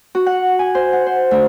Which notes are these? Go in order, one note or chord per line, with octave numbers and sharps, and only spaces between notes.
F#4
F#5
G#5
C5
F#5
C5
D2